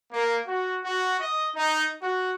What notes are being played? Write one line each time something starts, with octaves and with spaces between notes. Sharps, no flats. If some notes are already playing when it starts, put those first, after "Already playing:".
A#3
F#4
F#4
D#5
D#4
F#4